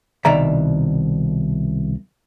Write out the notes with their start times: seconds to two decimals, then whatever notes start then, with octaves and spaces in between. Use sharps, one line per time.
0.25 C2 B2 D#3 D5 E5 A#5